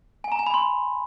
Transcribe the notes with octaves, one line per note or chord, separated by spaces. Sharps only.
G#5
A#5
G#5
B5
C6